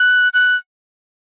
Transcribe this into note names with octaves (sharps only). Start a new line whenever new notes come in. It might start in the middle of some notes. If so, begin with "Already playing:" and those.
Already playing: F#6
F#6